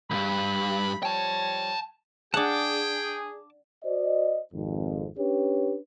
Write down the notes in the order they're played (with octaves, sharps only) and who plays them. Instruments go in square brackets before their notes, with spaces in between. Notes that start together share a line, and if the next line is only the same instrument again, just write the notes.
[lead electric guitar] C2 G2 [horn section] B5
[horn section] F3 G3 C#5 [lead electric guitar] G5 A5
[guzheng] D4 F#5 [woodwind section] G#4 [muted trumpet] G5 [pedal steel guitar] A5 D6
[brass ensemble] F#4 C5 D5 D#5
G#1 F2
C#4 D4 G4 B4 C#5